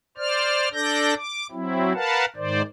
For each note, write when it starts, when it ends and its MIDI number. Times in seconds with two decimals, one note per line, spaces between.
0.18 0.69 72
0.18 0.69 74
0.18 0.69 89
0.73 1.14 62
0.73 1.14 69
0.73 1.14 74
0.73 1.14 91
0.73 1.14 94
1.17 1.47 86
1.51 1.93 54
1.51 1.93 60
1.51 1.93 64
1.94 2.25 70
1.94 2.25 71
1.94 2.25 77
1.94 2.25 78
1.94 2.25 81
2.36 2.62 44
2.36 2.62 51
2.36 2.62 72
2.36 2.62 74